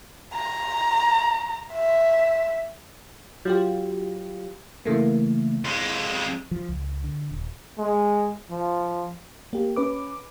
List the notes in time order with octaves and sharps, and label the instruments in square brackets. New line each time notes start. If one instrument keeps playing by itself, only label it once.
[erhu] A#5
E5
[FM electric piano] F#3 F4 G4
C#3 E3 A3 A#3
[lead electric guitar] F2 G#3
[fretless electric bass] F3
C#2
D3
D#1
[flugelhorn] G#3
F3
[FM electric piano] A#3 G4
C#4 B4 D6